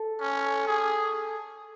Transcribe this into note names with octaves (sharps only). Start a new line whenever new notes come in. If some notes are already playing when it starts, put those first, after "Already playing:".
Already playing: A4
C#4
G#4